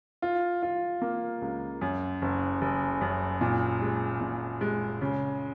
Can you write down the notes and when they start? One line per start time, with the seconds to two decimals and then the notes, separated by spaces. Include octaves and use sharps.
0.22 F4
0.62 F4
1.02 A#3
1.42 C#2
1.81 F#2
2.22 F#1
2.61 F#1
3.01 F#2
3.41 A#2
3.81 G#3
4.21 A#2
4.61 G#3
5.01 C#3